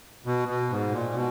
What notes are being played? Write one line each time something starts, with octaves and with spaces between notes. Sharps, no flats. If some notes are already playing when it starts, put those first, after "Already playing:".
B2
B2
G#2
A#2
B2